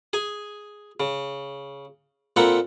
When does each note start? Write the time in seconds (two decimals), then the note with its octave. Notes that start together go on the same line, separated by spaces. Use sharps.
0.13 G#4 G#5
1.00 C#3
2.36 A#2 A#3 C4 A4 F#5 B5